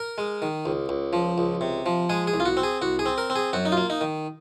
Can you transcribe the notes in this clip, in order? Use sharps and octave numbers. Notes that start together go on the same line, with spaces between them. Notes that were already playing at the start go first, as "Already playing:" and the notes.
Already playing: A#4
G#3
D#3
C#2
C#2
F3
C#2
C3
F3
G#3 G#4
G#4
C2
F4
F#4
C4
G#4
C2 F#4
G#4
C4
A#4
C4
G#4
F#2 F#4
D#4
F4
A#3
D#4
D#3